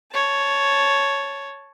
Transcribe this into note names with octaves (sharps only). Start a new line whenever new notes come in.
C#5 A5